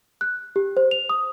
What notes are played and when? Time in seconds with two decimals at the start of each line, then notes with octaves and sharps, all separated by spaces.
0.21 F#6
0.56 G4
0.77 C5
0.91 F7
1.10 D#6